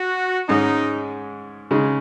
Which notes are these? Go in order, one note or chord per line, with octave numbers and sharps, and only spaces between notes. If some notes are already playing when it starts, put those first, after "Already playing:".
Already playing: F#4
G#2 G#3 C#4 D#4
C#3 G#3 D#4